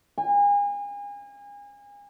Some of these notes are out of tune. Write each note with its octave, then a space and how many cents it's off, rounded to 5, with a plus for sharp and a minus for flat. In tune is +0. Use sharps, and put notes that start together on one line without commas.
G#5 -35